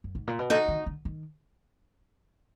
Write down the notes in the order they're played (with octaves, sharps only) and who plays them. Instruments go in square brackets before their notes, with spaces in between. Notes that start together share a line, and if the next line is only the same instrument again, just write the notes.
[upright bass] F#2
G#2
A#2
B2
[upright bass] D3 [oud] D#4 F#4
[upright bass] D#3
D3
D#3